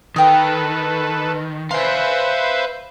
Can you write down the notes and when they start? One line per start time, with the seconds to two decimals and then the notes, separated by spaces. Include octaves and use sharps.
0.16 D#3 A4 B4 G5 D#6
1.71 B4 C5 E5 F5 G#5 C6